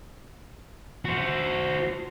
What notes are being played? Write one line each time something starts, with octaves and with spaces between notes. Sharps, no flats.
F#4 C5